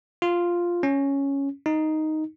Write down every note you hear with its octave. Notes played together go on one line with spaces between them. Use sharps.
F4
C#4
D#4